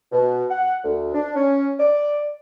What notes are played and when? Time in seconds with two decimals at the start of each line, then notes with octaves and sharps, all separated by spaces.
0.12 B2
0.49 F#5
0.83 D2
1.14 D4
1.35 C#4
1.79 D5